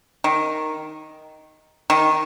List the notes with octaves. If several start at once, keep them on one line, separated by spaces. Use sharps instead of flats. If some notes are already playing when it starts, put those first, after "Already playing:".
D#3
D#3